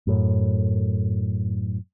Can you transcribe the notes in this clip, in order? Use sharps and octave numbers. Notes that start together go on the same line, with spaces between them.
F#2 A2